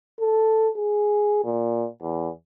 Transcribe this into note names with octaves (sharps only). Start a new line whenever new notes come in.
A4
G#4
A#2
E2